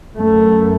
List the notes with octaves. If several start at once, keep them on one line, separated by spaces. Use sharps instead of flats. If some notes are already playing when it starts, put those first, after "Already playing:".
F#2 A3